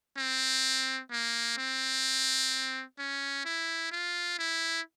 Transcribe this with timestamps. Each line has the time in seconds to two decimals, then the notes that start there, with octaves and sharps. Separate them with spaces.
0.17 C4
1.11 A#3
1.58 C4
2.98 C#4
3.45 E4
3.92 F4
4.39 E4